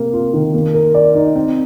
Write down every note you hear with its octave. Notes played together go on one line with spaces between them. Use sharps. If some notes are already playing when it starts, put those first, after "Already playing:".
Already playing: C3 A#3
F4
D#3
A#3
A#4
D5
D#4
C4